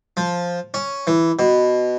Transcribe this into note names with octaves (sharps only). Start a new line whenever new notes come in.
F3
C#4
E3
B2